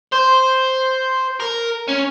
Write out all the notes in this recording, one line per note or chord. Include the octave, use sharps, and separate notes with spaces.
C5
A#4
C#4